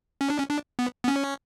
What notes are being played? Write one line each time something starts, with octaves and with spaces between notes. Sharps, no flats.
C#4
D4
C#4
D4
B3
B3
C#4